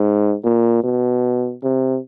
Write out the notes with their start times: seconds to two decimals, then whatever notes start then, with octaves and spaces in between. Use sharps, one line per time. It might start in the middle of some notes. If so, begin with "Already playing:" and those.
Already playing: G#2
0.44 A#2
0.83 B2
1.63 C3